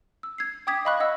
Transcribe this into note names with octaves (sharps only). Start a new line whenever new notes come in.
E6
G#6 C7
G5 D6 D#6 G#6 B6
D#5 F5 B5 C#6 F#6
D#5 F#5 E6